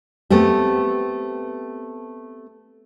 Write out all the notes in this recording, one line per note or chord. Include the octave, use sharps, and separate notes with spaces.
A3 B3 C4 G4